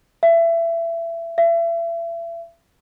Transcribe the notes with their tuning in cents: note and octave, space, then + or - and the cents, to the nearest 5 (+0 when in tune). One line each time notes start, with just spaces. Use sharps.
E5 +25
E5 +35